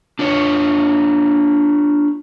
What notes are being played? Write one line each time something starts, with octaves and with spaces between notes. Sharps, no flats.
D4 F4 C#5